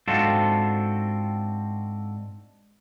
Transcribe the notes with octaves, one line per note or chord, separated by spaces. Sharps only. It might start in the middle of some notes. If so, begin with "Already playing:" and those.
G#2 C4 D4 F4 F#4 A4